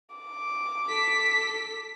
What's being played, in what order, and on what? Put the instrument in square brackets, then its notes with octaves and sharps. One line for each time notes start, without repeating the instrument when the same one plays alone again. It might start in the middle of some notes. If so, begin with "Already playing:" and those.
[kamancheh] D6
[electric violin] A4 B6